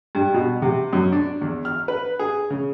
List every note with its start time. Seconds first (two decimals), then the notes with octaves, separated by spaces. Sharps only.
0.15 G2
0.34 B2
0.62 C3
0.93 F#2
1.12 D4
1.42 E2
1.65 F6
1.88 B4
2.19 G#4
2.50 C#3